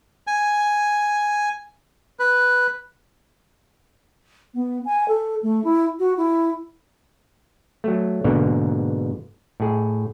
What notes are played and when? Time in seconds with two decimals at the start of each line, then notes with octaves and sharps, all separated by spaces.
0.27 G#5
2.20 B4
4.54 B3
4.85 G#5
5.08 A4
5.43 A3
5.64 E4
5.99 F#4
6.17 E4
7.84 F#3 A3
8.24 G#2 B2 D3 A#3
9.60 A2 G#4